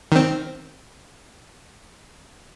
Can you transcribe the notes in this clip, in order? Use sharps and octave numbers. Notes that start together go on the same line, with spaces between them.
D#3 C4